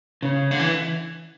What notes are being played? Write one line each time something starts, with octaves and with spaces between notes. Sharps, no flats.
C#3
D3
E3